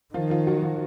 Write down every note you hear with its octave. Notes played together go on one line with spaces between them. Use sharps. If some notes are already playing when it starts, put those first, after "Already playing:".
D#3 F3 F4
F3 F4
F#3 F#4
F3 F4